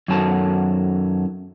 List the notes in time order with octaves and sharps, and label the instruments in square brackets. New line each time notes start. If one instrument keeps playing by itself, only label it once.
[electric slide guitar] F#2 D#3 F#3 A4 A5